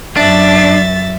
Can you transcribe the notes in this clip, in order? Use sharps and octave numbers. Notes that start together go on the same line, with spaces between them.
F#2 D4 E5 A6